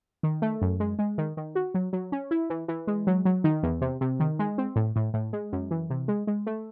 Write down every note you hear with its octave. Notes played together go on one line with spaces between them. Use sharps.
D#3
A3
F#2
G#3
G#3
D#3
D#3
F#4
F#3
F#3
C#4
E4
E3
E3
G#3
F#3
F#3
D#3
E2
C3
C3
D#3
G#3
C4
A2
A2
A2
G#3
F#2
E3
C3
G#3
G#3
A3